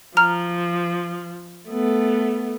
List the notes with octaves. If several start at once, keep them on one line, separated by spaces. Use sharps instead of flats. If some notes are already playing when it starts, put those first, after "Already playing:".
F3 A#5 F6
A3 B3